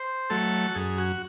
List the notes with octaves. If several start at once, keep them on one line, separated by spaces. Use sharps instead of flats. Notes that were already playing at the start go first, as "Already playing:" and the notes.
Already playing: C5
F#3 A3 A4
F#4
F#2 G#4
F#4